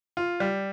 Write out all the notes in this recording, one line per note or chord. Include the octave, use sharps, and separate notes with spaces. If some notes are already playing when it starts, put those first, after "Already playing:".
F4
G3